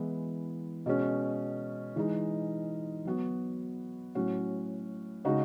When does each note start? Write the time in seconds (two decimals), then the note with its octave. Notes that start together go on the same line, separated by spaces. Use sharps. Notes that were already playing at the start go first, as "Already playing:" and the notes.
Already playing: E3 G#3 B3 E4
0.86 B2 G#3 C#4
1.96 E3 G#3 D#4
3.05 F#3 B3 F#4
4.15 A2 F#3 C#4 F#4
5.25 C#3 G#3 D#4 F#4